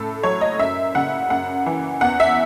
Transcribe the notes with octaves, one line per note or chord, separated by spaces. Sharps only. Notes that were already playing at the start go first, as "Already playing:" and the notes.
Already playing: A2 C#3 A4
F#3 C#5
D#5
F#2 E5
C#3 F#5
F#2 F#5
E3
E2 F#5
E5